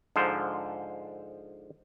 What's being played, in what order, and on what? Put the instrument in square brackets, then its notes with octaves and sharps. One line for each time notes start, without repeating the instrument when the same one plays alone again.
[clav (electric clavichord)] G#2 D3 F3 C5